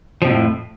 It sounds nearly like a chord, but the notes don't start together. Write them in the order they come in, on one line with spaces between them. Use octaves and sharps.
F3 C3 F2 A2